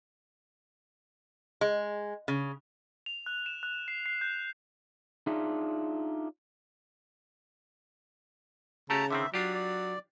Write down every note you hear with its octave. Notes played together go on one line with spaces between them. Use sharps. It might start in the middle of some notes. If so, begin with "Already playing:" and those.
G#3
C#3
F7
F#6
E7
F#6
C7
C7
G6
D4 D#4 F4 G#4 E5
C#3 A3 F#4 G4 A5 A#5
D3 D#3 C4 E5
F#3 D4 F4 G4 D5
D5